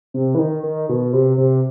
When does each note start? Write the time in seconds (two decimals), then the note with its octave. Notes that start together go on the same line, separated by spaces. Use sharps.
0.14 C3
0.35 E3
0.39 D#3
0.63 D#3
0.89 B2
1.13 C3
1.38 C3